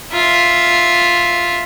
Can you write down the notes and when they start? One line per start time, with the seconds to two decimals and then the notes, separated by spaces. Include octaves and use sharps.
0.12 F4 E5